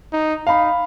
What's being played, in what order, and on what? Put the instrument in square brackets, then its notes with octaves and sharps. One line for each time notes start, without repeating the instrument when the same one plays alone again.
[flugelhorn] D#4
[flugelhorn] D#4 [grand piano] F5 B5